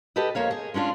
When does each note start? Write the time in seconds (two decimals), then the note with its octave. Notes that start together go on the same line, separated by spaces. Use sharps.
0.16 G4 A4 B4 D#5
0.35 F2 A#3 C#5 F5
0.51 G#4
0.74 G#3 C#4 D4 F4